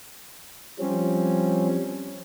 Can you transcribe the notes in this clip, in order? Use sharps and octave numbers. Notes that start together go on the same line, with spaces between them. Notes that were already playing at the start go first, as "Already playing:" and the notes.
F3 G3 C4 C#4